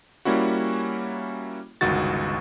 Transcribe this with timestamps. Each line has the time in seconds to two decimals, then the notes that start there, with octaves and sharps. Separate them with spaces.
0.25 G3 A#3 C#4 E4 F#4
1.81 G1 C#2 D#3 F#4 A6